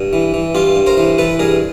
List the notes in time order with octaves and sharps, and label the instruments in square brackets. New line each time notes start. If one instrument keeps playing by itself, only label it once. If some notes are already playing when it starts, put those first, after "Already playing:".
Already playing: [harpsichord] G2
E3
E3
G2 F4 G4
G2
A#4 C5
E3
E3 A4 B4
G2 G#4 A#4